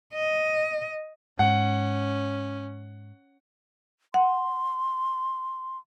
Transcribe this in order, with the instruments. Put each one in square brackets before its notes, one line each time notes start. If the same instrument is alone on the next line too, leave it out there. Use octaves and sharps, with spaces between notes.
[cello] D#5
[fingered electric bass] G#2 [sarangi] C#4 [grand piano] F#5
[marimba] F#5 [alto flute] C6